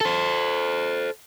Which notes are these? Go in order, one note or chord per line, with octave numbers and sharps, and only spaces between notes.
A4 C5